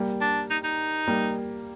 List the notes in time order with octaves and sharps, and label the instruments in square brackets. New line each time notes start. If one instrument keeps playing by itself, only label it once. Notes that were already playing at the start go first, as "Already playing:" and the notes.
Already playing: [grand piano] G3 A#3
[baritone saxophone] D4
D#4
D#4
[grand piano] G3 A#3